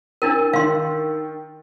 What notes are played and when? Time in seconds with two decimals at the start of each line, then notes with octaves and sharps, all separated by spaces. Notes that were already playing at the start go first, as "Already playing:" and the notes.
0.22 D4 E4 A#4 G5 E6 A6
0.53 D#3 F5 C6